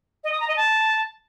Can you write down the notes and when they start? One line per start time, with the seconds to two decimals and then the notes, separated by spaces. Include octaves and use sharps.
0.24 D#5
0.32 D#6
0.40 A#5
0.48 D#5
0.56 A5